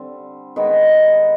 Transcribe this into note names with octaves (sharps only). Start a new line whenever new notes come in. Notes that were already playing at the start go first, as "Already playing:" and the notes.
Already playing: D3 G3 C4
D#3 G#3 B3 D#4